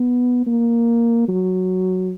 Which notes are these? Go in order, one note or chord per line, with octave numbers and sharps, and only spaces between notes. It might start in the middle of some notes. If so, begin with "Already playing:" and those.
Already playing: B3
A#3
F#3